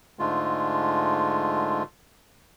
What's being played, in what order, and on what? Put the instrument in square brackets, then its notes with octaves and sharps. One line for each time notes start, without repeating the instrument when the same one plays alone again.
[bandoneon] G#2 D3 G#3 A3 F4